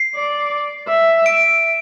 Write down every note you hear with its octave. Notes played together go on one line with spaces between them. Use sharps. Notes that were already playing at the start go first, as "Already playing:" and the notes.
Already playing: C7
D5
E5
D7